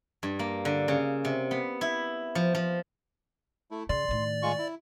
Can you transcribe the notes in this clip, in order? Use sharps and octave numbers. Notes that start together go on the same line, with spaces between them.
G2
A#3
D3
C#3
C3
B3
E4
F3
F3
A3 E4
C#3 D5 C6
A2 D#3
G#3 F4 C#6
E4